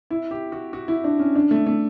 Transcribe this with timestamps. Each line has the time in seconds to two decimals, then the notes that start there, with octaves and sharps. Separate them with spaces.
0.10 E4
0.31 G4
0.52 F#4
0.73 F#4
0.88 E4
1.04 D4
1.19 C#4
1.35 D4
1.51 A3
1.66 A3